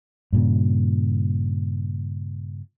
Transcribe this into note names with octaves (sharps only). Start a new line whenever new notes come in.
G2 A#2 C#3